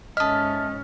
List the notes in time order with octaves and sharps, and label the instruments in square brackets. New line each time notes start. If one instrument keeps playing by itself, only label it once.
[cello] G#2 C#4 [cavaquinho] A4 E5 [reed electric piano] D#5 D#6 [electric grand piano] F6